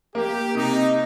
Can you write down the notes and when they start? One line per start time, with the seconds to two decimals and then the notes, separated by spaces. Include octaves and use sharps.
0.15 A#3 G4
0.55 C3 D#4